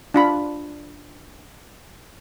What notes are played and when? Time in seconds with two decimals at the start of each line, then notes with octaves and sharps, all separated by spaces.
0.14 D4 F4 B5